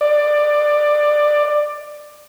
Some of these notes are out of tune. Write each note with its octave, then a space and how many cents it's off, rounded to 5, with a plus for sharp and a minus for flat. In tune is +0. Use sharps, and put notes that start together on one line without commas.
D5 +15